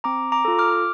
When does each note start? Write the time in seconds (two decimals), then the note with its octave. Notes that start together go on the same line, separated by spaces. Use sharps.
0.04 C4 A#5 D6
0.32 A#5 D6
0.45 F4 A4
0.58 D6 F6